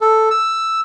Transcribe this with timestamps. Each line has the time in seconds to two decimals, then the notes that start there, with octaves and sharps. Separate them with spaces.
0.01 A4
0.31 E6